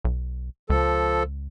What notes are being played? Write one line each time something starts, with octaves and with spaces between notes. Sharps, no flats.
B1
C#2 F3 A4